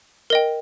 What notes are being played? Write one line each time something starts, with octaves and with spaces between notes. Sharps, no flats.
A#4 D#5 G5